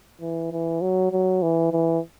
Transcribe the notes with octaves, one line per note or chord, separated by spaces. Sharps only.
E3
E3
F#3
F#3
E3
E3